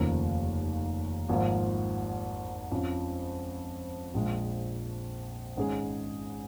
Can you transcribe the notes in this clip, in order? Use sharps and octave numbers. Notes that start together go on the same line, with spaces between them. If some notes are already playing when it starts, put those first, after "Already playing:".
Already playing: F1 D#2 C#3 F3 A#3
G#1 G#2 F3 A#3 F4
F2 F3 C#4
A#1 A#2 G#3
G#1 G#2 G#3 C#4 G#4